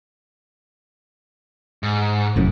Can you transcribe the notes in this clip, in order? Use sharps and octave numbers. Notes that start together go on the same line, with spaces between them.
G#2
F1 F#2 A2